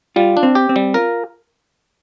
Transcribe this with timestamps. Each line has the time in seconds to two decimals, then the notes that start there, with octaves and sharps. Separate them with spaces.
0.16 G3 F4
0.37 D4
0.43 C4
0.55 G4
0.69 C4
0.76 G3
0.94 F4 A#4